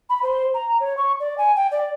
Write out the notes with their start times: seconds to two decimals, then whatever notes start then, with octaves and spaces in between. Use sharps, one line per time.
0.10 B5
0.23 C5
0.54 A#5
0.80 C#5
0.97 C#6
1.20 D5
1.38 G#5
1.56 G5
1.71 D5